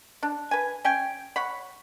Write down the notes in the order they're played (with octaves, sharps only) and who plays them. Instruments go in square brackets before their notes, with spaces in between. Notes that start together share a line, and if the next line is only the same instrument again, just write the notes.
[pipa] D4
B4 G#5
C#4 G5 G#5
C#5 F#5 B5